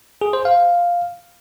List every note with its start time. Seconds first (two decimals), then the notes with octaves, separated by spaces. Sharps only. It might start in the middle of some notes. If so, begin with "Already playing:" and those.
0.21 G#4
0.33 C5
0.45 F5